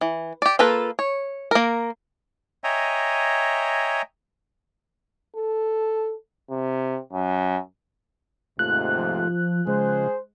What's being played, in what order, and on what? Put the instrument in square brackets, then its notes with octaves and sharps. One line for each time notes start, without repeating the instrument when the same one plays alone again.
[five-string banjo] E3
G4 D5
A#3 F4 A4 B4
C#5
A#3 A#4
[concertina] C#5 D#5 E5 G5 G#5 A#5
[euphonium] A4
C3
F#2
[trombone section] D#2 G#2 C3 [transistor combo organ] A3 F4 [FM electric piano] F#6
[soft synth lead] F3
[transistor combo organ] C#3 F3 [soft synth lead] G#3 [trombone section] G#4 C5